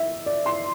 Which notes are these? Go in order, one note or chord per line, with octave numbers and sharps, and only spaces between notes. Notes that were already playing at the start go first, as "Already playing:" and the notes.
Already playing: E5
D5
C6